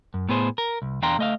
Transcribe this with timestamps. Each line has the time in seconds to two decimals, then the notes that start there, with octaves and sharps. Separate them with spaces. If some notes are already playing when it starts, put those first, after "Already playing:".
0.14 F#2
0.29 A2 B3 G#4 C5
0.58 A#4
0.82 C2
1.02 E2 D4 F5 G5 A#5 C6
1.19 A3 D#5 F5